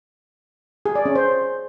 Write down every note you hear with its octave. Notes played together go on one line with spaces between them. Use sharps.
G#4
D5
C#4
C5